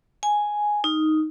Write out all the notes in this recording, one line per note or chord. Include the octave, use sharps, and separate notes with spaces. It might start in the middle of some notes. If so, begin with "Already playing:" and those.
G#5
D#4